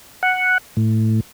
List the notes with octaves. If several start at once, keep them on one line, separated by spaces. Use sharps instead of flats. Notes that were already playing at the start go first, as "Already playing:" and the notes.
F#5
A2